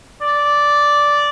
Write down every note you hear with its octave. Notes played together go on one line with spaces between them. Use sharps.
D5